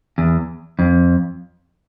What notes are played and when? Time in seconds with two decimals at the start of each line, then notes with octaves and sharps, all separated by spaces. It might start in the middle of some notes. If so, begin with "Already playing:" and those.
0.18 E2
0.79 F2